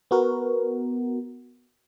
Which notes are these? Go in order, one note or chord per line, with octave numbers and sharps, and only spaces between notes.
B3 F#4 A#4